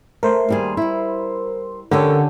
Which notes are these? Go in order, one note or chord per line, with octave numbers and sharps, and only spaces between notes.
A3 A#4 C5 C6
D#2 G3 G#4
G3 E4
D3 C#4 D4 G4 A#4 C#5